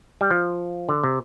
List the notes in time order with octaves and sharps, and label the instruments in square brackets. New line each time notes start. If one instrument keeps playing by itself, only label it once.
[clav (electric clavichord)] G3
F3
D3
C3